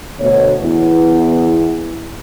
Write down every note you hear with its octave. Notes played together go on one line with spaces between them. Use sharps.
D2 B2 C#5
E2 B3 E4